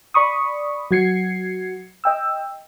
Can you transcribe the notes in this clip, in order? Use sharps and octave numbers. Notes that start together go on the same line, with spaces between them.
D5 B5 C#6 D#6
F#3 F#4 G#6 C7 C#7
D#5 G5 E6